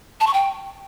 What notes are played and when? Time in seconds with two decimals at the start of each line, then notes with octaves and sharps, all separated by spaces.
0.21 A5
0.27 C#6
0.34 G5